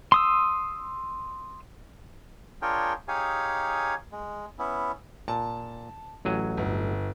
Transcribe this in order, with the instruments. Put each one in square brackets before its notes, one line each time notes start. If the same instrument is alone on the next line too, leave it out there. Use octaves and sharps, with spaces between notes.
[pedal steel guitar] C6 D#6 E6
[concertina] D4 F4 G#4 A#4 C#5 G5
D#4 G4 G#4 C#5 F5 G#5
G#3
B3 C#4 E4
[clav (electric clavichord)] A#2 [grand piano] A5
[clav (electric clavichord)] A1 F#3 G#5
[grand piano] G1